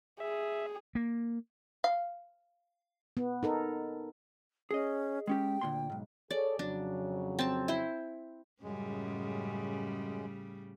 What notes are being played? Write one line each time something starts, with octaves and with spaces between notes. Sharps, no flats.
G#4 E5
A#3
F5
B3
D#4 A4 A#4
C#4 G#4 D#5
G#3 C#4 G4 G5
D2 A#2 C6
B1 G#2
G#4 A4 C#5 D5
F2 C#3 F#3 D4
C4 A5
E4 C5
F#2 A2 C#3 G3 G#3